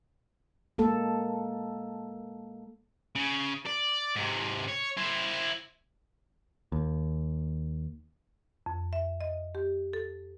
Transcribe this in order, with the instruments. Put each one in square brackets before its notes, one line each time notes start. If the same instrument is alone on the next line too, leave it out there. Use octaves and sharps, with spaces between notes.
[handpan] G#3 A#3 A4
[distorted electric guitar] C#3
D5
G#2 C3
C#5
E4 C5
[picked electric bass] D#2
[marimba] F2
E5
D#5
G4
A4